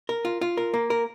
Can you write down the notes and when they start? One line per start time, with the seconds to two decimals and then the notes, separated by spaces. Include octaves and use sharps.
0.09 A#4
0.25 F4
0.41 F4
0.57 A#4
0.74 A#3
0.90 A#4